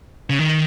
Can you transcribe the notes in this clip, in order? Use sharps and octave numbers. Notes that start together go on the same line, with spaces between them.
C#3
D#3